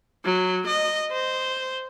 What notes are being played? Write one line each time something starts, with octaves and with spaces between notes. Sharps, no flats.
F#3
D#5
C5